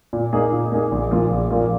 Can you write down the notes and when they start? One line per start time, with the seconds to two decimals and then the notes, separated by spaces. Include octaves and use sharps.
0.13 A#2
0.33 A#3 D#4 G#4
0.52 A#2
0.72 A#3 D#4 G#4
0.91 A#1
1.11 A#2 F3 A#3 F4
1.31 A#1
1.50 A#2 F3 A#3 F4